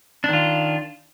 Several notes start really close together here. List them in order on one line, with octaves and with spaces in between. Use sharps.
D4 D#3 F4